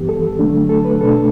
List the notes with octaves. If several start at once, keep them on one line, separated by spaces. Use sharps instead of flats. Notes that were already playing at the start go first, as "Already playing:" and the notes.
Already playing: G2 E3 B3 G4
A4
D3 F#3 A3 D4
A4
B4
B2 A3 D4 A4